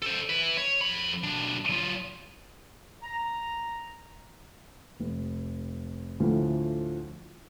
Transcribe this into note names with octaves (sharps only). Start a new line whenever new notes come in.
A4 C5
E4 B4
C#5
F2 B5
B1 D4
F#3 F4
A#5
F1
D2 A2 F3